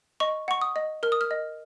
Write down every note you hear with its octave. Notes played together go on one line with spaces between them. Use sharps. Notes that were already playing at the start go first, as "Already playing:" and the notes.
D#5 C#6
F#5 C#6
D#6
D#5
A#4 F6
D#6
F6
D#5